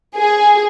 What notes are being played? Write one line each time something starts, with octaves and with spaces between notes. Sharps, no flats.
G#4